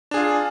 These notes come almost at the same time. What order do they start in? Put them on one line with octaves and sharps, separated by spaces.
D4 G#4 F4